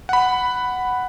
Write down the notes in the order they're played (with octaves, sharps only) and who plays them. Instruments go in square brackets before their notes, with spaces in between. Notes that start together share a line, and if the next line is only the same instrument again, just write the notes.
[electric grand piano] F#5 B5